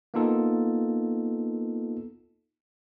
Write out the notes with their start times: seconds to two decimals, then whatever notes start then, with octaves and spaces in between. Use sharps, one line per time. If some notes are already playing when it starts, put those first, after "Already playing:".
0.14 A#3 B3 D#4 F4 A4